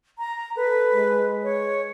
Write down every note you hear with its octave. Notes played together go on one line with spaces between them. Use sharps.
A#5
A4 B4
G#3
C#5